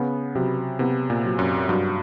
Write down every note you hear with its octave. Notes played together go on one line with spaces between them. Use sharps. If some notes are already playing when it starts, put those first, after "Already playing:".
Already playing: C#3 B3
C3 F#3
C3 B3
A#2
F#3
F#2
G2 F#3